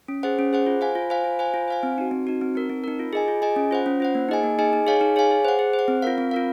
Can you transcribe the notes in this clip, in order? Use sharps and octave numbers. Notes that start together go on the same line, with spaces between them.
C#4
G#4 C5 F#5
C#4
G#4 C5 F#5
F4
C5 F5 G#5
F4
C5 F5 G#5
F4
C5 F5 G#5
F4
C5 F5 G#5
C4
D#4 F#4
C4
D#4 F#4
C4
D#4 A#4
C4
D#4 A#4
F4
G#4 D#5 G#5
F4
G#4 D#5 G#5
C#4
F4 C5 F#5
C#4
F4 C5 F#5
A#3
D#4 G#4 D#5 G#5
A#3
D#4 G#4 D#5 G#5
D#4
G#4 C#5 F5 G#5
D#4
G#4 C#5 F5 G#5
G#4
C5 F#5
G#4
C5
F#5
C4
F4 A#4 F5
C4
F4 A#4 F5